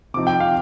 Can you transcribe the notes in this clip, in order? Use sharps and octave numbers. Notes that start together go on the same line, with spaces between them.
C3 F3 C4 D#4 D6
G5
F5